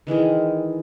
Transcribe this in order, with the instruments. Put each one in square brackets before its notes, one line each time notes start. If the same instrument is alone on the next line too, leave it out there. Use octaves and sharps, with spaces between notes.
[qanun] D#3 E3 G#3 G#4